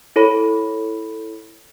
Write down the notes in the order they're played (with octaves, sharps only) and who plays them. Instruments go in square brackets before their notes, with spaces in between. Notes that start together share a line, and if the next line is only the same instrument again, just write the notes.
[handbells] E4 A4 C#5 B5